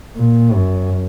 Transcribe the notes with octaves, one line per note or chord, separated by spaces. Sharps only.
A#2
F#2